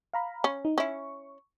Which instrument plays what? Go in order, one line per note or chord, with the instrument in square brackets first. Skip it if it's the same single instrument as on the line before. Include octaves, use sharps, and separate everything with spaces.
[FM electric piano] F5 A#5 B5
[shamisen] C#4
[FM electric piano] D#4
[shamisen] C#4 E4 [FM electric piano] C#6